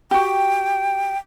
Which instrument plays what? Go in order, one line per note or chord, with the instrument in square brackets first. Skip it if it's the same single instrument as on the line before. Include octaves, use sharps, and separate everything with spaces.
[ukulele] F#4 G4 [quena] G5